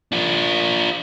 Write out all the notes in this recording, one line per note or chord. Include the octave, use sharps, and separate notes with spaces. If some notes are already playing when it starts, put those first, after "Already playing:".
D4 F4